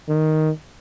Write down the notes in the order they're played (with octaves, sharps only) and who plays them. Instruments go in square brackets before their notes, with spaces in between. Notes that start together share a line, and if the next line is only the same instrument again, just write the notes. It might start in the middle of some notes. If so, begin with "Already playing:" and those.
[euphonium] D#3